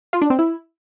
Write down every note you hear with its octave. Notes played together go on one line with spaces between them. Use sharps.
F4
D4
C4
E4